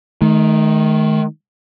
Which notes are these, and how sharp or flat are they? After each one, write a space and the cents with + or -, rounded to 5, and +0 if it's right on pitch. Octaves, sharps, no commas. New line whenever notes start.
D#3 +0 A3 -40